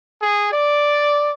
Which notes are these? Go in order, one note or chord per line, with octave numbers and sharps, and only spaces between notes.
G#4
D5